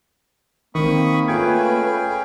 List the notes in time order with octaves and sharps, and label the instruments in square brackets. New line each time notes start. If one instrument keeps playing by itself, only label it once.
[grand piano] D#3 C4 [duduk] A#3 [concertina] B5 C#6 D#6
[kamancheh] A3 B4 [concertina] C#4 G#4 G5 [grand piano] F4 G#6